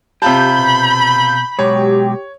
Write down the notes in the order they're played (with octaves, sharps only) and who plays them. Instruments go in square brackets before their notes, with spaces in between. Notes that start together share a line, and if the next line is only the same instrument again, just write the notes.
[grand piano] C3 F4 A5 [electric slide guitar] G4 [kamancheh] B5 [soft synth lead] G6
[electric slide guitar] B2
[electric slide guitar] B2 F#3 G#3 [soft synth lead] G4 [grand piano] C#5